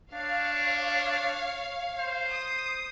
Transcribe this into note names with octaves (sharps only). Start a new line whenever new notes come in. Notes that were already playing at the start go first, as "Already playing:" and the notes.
D4 C#5 F5
C5
D#6